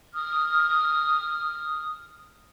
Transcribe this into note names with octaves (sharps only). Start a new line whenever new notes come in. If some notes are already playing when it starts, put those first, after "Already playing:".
D#6 F6